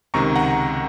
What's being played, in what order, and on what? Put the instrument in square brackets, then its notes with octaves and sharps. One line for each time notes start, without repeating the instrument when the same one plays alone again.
[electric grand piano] C#2 C3 D#3 A#5 C#6
F#5 A#5